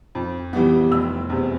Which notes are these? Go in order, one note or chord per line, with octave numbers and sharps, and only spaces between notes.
F2
E3 G3 B3
F1 E6
E2 C3